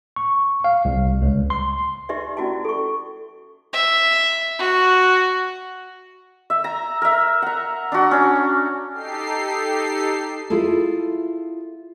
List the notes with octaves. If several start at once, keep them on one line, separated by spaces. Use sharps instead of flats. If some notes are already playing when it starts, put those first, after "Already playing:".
C#6
F5
C2
C#2
C6
D#4 G4 B4 D5 E5
C#4 E4 F#4 D5 A5
A4 C#6
E5
F#4
E5
A#5
A#4 E5
F#5 A#5
D4 F#4
C#4 D4
D#4 G4 A4 C7
E4 F4 G#4 A4